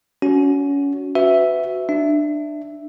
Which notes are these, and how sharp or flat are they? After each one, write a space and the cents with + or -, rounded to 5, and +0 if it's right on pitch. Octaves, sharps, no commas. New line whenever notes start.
C#4 +25 F#4 +0
F#4 +0 B4 +30 E5 +0
D4 +20 E5 +0